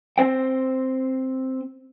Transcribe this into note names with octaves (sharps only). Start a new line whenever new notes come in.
C4 C5 G5